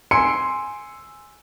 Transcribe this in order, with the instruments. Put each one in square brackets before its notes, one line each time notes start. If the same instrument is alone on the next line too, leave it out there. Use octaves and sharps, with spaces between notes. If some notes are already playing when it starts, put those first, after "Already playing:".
[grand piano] G#5 C6 E6 C#7 D7